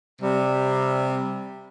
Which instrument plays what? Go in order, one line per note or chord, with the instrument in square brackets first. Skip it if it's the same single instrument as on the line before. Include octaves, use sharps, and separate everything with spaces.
[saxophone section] C3 G3